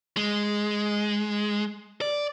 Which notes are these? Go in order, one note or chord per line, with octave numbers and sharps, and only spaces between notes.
G#3
D5